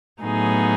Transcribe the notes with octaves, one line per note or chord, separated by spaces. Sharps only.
A2 F#3 B3 D#4 G#4